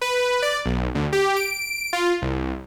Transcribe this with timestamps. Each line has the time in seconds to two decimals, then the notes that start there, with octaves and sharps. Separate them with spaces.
0.01 B4
0.42 D5
0.66 B1
0.95 D2
1.13 G4
1.36 D7
1.93 F4
2.22 C2